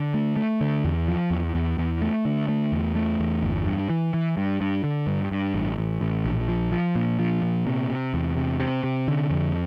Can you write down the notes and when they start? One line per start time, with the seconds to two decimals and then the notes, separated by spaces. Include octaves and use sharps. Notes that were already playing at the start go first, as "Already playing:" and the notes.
Already playing: D3
0.14 A3
0.37 A3
0.61 D3
0.84 E2
1.08 F3
1.30 E2
1.55 E2
1.78 E2
2.01 A3
2.25 D3
2.49 A3
2.72 E2
2.96 A3
3.20 E2
3.43 G1
3.66 G2
3.90 E3
4.14 E3
4.37 G2
4.61 G2
4.84 D3
5.07 G2
5.31 G2
5.54 A1
5.78 A1
6.01 A1
6.25 A#1
6.48 F3
6.72 F3
6.95 A#2
7.19 F3
7.43 A#2
7.67 C3
7.90 C3
8.14 E2
8.37 C3
8.60 C3
8.84 C3
9.08 D3
9.31 F2